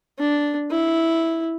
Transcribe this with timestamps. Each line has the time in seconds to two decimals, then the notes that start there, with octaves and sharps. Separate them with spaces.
0.19 D4
0.70 E4